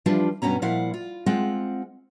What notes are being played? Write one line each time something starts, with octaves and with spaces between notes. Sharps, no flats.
E3 F3 G3 D4 F4
G2 B2 B3 C#4 A#5
A#2 F3 E4 F5 F#5
F4
G#3 C4 F4 F#5